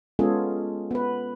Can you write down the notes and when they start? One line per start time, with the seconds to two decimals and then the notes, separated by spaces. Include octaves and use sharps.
0.19 G#3 B3 C#4 F4 G#4 A4
0.91 B3 B4